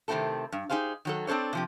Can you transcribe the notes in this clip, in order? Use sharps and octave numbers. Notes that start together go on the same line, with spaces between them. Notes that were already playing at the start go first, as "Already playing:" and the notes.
C3 D#3 A3 C4 E4 A4
G2
D#4 G4 G#4 C5 F5
D#3 F#3 A4
C4 D4 A4 C5 C#5
C3 F3 G4